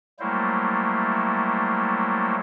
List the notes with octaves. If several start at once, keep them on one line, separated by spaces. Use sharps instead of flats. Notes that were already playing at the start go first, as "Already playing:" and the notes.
F#3 G3 A3 A#3 E4 C5